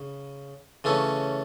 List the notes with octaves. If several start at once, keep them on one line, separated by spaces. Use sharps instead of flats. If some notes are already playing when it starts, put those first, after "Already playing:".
Already playing: C#3
C#3 E3 A3 C#4